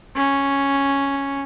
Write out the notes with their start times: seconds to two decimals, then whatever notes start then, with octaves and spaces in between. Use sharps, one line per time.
0.16 C#4